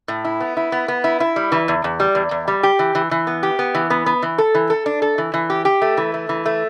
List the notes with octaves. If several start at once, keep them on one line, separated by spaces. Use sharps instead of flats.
A2
E4
B3
E4
B3
B3
E4
E4
G3
E3
E2
E2
G3
E2
E2
G3
G4
E3
E3
E3
B3
G4
B3
E3
B3
B3
E3
A4
E3
A4
D4
A4
E3
E3
G4
G4
A3
E3
A3
E3
A3